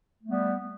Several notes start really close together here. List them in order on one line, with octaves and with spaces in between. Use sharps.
A3 B3 G3